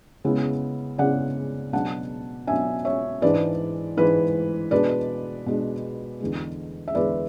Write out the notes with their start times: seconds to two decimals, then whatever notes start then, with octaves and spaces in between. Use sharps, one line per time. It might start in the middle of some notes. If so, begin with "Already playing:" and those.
0.24 C#3 G#3 B3 E4
0.98 C#3 G#3 B3 E4 D5 F#5
1.73 B2 F#3 B3 D4 F#5 A5
2.47 B2 F#3 B3 D4 E5 G#5
2.85 C#5 E5
3.22 G#2 E3 G#3 D4 B4 D5
3.97 G#2 E3 G#3 D4 B4
4.71 B2 G#3 D4 B4 D5
5.46 B2 G#3 D4
6.20 E2 D3 G#3
6.88 E5
6.95 E2 D3 G#3 B4 D5